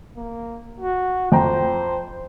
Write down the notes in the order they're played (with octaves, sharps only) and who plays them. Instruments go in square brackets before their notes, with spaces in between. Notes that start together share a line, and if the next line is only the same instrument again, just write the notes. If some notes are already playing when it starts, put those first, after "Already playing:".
[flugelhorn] A#3
F#4
[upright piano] F2 G5 A#5 [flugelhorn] C5